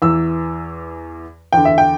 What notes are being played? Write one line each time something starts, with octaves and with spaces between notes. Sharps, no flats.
E2 E3 E6
E2 D3 G5
E5
G5